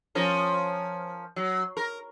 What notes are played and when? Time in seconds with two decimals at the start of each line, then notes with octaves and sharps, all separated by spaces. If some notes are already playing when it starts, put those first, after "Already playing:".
0.15 F3 C#4 A#4
1.36 F#3
1.77 A#4